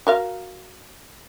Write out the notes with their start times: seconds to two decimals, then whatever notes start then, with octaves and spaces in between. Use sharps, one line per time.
0.07 F#4 A#4 F5